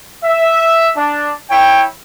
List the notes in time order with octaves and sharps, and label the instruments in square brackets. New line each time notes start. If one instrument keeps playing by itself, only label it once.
[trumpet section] E5
D4
E4 C#5 G5